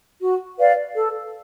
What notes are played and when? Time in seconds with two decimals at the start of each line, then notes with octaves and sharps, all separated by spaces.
0.21 F#4
0.58 B4 D5 F5
0.95 A4